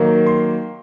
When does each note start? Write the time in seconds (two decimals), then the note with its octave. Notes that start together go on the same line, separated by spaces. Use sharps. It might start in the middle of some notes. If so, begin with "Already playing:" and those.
Already playing: D#3 F#3 A#3
0.27 C6